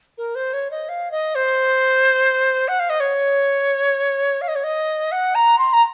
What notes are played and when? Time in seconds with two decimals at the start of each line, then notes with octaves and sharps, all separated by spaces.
0.18 A#4
0.35 C5
0.53 C#5
0.71 D#5
0.89 F5
1.11 D#5
1.35 C5
2.68 F#5
2.79 F5
2.90 D#5
3.00 C#5
4.42 F5
4.48 D#5
4.55 C#5
4.64 D#5
5.12 F#5
5.35 A#5
5.58 C6
5.73 A#5